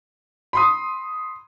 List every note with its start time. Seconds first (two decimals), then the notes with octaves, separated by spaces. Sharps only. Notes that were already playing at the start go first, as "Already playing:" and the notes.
0.53 B5 C6 D#6